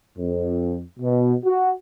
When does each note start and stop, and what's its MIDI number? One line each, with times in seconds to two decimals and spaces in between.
0.19 0.82 41
1.00 1.34 47
1.46 1.72 66